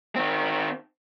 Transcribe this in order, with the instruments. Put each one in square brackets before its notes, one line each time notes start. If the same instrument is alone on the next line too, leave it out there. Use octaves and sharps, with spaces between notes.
[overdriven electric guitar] D#3 C4